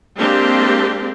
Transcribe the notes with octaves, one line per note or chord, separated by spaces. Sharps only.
G#3 A#3 C4 D4 G4